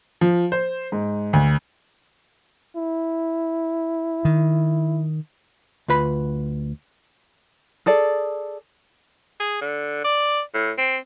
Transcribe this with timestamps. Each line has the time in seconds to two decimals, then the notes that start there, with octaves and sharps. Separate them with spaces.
0.21 F3
0.52 C5
0.92 G#2
1.33 D2
2.76 E4
4.25 D#3
5.88 D2 F4 B4 B5
7.86 G#4 A4 D5
9.40 G#4
9.61 D3
10.04 D5
10.54 A2
10.78 C4